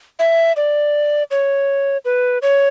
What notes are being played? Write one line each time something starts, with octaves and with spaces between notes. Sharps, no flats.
E5
D5
C#5
B4
C#5